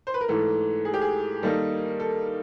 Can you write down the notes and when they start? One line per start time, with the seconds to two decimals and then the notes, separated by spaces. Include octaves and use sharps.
0.07 C5
0.14 B4
0.21 A#4
0.28 G#2 E3 A3 A4
0.85 G#4
0.94 G4
1.01 G#4
1.42 D#3 G3 A#3 D#4 A4
2.00 A4